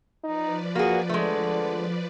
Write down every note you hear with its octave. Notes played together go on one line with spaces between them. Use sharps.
F3 D#4 B4 D5
A#3 F#4 G#4
D3 G#3 A3